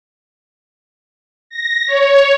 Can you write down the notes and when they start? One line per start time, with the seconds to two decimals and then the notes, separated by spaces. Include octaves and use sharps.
1.50 A#6
1.87 C#5